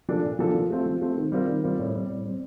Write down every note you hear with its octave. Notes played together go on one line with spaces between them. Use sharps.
F3 A#3 D4 A4
A#2
F3 A#3 D4 A4
F3
A3 C4 F4
F3
A3 C4 F4
D#3
G3 C4 F4 A#4
D#3
G3 C4 F4 A#4
A2
G3 C4
A2
G3 C4